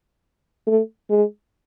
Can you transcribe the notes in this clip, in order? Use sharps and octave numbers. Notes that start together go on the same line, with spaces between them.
A3
G#3